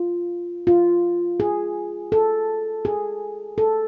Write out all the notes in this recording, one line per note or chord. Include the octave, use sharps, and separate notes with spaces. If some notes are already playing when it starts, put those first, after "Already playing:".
Already playing: F4
F4
G#4
A4
G#4
A4